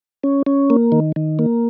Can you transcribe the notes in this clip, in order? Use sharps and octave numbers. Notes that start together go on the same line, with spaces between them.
C#4
C#4
A#3
D#3
D#3
A#3